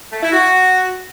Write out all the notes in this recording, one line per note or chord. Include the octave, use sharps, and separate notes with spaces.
A3
E4
F#4